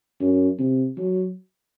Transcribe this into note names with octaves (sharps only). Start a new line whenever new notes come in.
F#2
C3
F#3